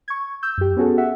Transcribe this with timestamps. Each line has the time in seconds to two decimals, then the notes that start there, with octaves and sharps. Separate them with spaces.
0.08 C#6 G#6
0.43 E6 G6
0.58 F#2 G4
0.77 B3 C#4 F#4 G#4 A4
0.98 E5 F#5